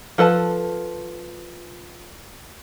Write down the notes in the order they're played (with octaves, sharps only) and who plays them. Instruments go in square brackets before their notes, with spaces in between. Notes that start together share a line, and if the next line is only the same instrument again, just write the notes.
[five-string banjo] F3 A4 B4 A5